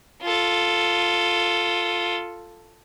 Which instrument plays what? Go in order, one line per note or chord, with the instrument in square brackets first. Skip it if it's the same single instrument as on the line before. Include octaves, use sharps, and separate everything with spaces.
[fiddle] F4 A4